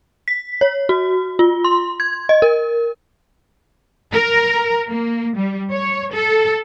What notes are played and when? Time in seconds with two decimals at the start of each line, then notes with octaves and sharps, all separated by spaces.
0.28 B6
0.61 C#5
0.89 F#4
1.39 F4
1.64 C6
2.00 G#6
2.29 D#5
2.42 A#4
4.14 A#4
4.89 A#3
5.35 G3
5.71 C#5
6.13 A4